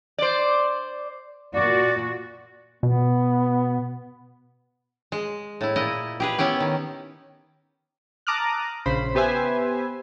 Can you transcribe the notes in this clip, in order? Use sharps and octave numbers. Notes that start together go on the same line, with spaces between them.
C5 D5
A#2 F#4 D5
B2 B3
G#3
A2 E4
A#2 E4 D#5
G4 G#4 B4
B3 C#4 E4 G4
D#3
A5 A#5 D6 D#6 F6 F#6
A#1 C#3 C5 B5
B3 G4 B4 C5 E5 G#5